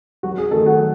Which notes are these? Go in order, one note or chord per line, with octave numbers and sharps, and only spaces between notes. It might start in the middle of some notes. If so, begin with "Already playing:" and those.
F#3 F#4
G#4
D#3 A3 A4
F#4 F#5
F#3